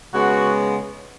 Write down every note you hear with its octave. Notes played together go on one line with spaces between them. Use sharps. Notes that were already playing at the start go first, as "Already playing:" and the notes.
C#3 G#3 B3 F#4